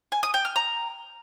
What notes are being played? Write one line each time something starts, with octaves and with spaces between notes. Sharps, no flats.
G#5
D#6
G5
F6
A#5